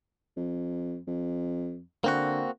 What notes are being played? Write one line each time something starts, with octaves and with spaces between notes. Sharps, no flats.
F2
F2
D3 A#3 C4 F#4